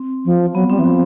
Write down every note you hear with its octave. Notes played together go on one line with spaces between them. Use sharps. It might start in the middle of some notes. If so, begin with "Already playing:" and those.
Already playing: C4
F3
F#3 B3
G3 C4
E3
F3